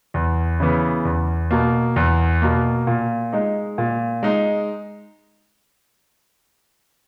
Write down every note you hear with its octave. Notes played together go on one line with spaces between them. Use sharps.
E2
C#3 E3 B3
E2
B2 A#3
E2
B2 A#3
A#2
G#3 D#4
A#2
G#3 D#4